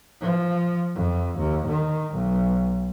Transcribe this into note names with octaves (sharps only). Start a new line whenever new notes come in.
F3
F2
D#2
D#3
B1